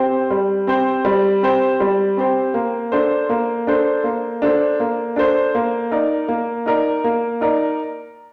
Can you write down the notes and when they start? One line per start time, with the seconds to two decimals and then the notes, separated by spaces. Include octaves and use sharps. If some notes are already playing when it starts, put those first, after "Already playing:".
Already playing: C4 G4 C5
0.31 G3
0.67 C4 G4 C5
1.05 G3
1.43 C4 G4 C5
1.80 G3
2.17 C4 G4 C5
2.54 A#3
2.92 D4 A4 C5
3.29 A#3
3.67 D4 A4 C5
4.04 A#3
4.42 D4 A4 C5
4.80 A#3
5.16 D4 A4 C5
5.55 A#3
5.91 D#4 A#4 D5
6.28 A#3
6.66 D#4 A#4 D5
7.04 A#3
7.41 D#4 A#4 D5